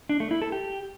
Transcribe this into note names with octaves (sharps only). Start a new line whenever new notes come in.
D4
A3
E4
A4
G4